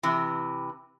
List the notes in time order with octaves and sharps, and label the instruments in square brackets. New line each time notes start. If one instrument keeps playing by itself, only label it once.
[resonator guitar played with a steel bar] C3 E3